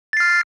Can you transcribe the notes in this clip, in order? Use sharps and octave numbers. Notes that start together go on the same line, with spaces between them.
F6 A6 C7